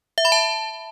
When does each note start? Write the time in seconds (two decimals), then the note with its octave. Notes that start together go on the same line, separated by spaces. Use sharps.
0.18 E5
0.25 B5
0.32 A5